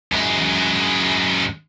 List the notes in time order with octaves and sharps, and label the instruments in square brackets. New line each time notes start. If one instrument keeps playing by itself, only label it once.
[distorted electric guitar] F#2 G#3